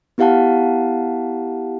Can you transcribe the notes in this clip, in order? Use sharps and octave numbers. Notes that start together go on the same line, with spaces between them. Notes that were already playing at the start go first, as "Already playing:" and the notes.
B3 E4 G4 F5 F#5 A5